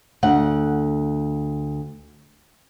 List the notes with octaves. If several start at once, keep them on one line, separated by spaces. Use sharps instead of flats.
D2 F#5